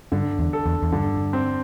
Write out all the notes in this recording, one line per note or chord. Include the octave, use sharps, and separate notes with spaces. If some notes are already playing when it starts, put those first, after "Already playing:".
G2 D3
E2
A4
E2
E2
G2 D3
C4